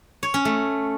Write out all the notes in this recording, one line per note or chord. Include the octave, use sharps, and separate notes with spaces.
C#5
C#4
A3